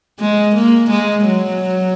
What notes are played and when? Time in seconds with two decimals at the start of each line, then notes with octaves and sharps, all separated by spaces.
0.20 G#3
0.55 A#3
0.90 G#3
1.26 F#3